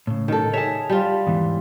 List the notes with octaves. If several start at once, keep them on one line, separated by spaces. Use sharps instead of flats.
A2 C#3
D#3 A4
G#4 C#5 E5 A5
G3 F4
E2 G#2 E3